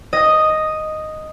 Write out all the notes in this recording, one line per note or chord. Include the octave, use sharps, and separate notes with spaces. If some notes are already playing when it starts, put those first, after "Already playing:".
D#5